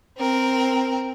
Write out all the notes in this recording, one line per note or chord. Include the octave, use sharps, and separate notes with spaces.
C4 A#4